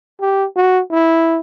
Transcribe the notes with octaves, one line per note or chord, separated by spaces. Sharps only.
G4
F#4
E4